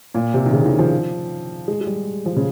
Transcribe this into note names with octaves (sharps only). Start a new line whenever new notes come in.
A#2
C3
D#3
C#3
D#3
F3
G#3
G#3
G3
F3
C#3